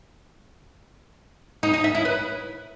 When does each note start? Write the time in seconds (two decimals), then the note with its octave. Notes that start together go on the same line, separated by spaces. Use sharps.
1.63 D#4
1.74 D#4
1.84 E5
1.95 E4
2.05 B4